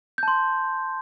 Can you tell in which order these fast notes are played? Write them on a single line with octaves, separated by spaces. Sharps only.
G6 A5 C6